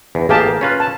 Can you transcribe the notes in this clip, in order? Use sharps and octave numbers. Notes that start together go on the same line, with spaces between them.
E2
A1 A#3 G4 G#4 F5 A5
A#4
C#4 F4 B4
A5